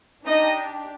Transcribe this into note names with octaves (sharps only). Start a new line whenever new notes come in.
D4 D#4 G4 D#5